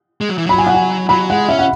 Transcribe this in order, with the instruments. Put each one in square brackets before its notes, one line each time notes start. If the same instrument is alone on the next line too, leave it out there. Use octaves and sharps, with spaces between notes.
[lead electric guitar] G#3
F#3
E3
[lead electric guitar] F#3 [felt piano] B5
[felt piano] G#5
F#5
G#5
[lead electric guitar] F#3 [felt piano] B5
[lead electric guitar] G#3 [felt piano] F#5
[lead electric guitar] C#4 [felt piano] E5
[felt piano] F#5